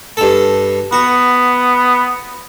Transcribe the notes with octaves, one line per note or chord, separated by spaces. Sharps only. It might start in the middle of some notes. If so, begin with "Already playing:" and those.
G2 A4
B3 F#4